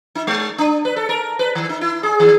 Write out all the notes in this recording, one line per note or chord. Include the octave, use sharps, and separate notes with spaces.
D#4
G#3
D4
B4
A4
A#4
B4
D#3
D#4
E4
G#4
D#3